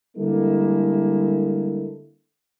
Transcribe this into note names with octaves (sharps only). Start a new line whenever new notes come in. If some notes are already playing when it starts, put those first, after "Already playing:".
D3 G3 G#3 A#3 E4 A4